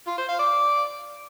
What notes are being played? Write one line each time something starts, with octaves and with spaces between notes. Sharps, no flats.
F4
C5
F5
D5